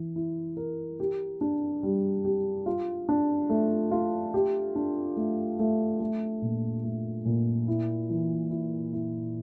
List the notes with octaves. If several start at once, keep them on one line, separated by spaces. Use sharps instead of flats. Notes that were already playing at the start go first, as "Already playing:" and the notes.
Already playing: E3
E4
A#4
G4
D4
G3
G4
F4
D4
A3
F4
G4
D4
A3
A3
A3
A#2
A3
A#2
E4
E3
E4
E4